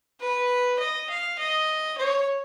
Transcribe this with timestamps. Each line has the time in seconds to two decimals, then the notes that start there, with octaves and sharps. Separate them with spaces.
0.20 B4
0.80 D#5
1.10 F5
1.39 D#5
1.98 C#5